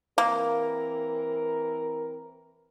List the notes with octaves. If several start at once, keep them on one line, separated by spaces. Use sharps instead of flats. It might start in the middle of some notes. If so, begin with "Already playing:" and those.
E3 A#3 C4 A#4